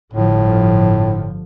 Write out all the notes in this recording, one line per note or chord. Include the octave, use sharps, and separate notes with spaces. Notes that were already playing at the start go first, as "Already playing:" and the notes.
G1 A2 D3 F3